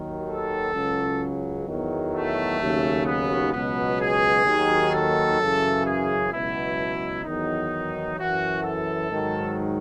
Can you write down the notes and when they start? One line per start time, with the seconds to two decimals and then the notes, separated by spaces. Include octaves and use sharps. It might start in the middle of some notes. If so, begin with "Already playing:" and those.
Already playing: D#2 D#3 F#3
0.28 A4
0.74 C#2 C#3 F#3
1.67 E2 D#3 F#3
2.14 A3
2.60 D#2 C#3 F#3
3.06 B3
3.52 C#2 B2 F#3 B3
4.00 G#4
4.46 D#2 D#3 F#3
4.93 A4
5.38 F#2 C#3 E3
5.85 G#4
6.31 C#2 B2 F#3 E4
7.25 E2 D#3 F#3 D#4
8.17 F#2 E3 F#4
8.63 A4
9.10 G#2 D#3 F#3